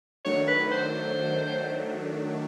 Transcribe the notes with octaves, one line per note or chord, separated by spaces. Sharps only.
D#3 F#3 A3 D4 C#5
B4
C5